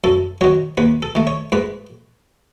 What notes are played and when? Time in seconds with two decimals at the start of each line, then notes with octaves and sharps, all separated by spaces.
0.04 F#2 A4
0.41 D#3 F#3 C#5
0.77 D#2 B4
1.02 A4
1.15 D#3 A3
1.27 C#5
1.52 G#2 B4